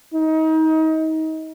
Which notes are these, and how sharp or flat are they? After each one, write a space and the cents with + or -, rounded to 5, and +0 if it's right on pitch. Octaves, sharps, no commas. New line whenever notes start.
D#4 +30